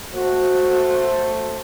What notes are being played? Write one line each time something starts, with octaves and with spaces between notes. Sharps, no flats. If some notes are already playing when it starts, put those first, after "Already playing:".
A3 F#4 C5